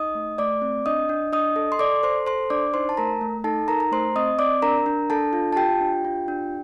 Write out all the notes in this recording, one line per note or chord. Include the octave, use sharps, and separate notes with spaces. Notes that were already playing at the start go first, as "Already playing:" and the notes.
Already playing: D#4 D#5 D#6
A3
A3 D5 D6
C4
D4 D#5 D#6
D4
D4 D#5 D#6
A4
C6
A4 D5 D6
A4 C5 C6
A4 C5 C6
D4 D5 D6
D#4 C5 C6
A5
A3 A#4 A#5
A3
D#4 A4 A5
D#4 A#4 A#5
A#5
A3 C5 C6
C4 D#5 D#6
C4 D5 D6
D4 A#4 A#5
D4
D4 A4 A5
F4
A5
F4 G4 G5
D4
F4
D4